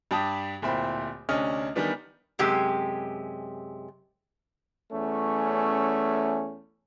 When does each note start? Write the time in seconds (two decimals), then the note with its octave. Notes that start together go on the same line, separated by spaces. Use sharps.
0.11 G2 G3 G5 A5 D#6
0.62 D1 A#2 E4 C5 G5 B5
1.29 D2 C3 C#4 D4 D#5 F6
1.76 D#3 E3 G3 B3 D4
2.39 F#2 C3 G#3 G4
4.91 E2 A3 C#4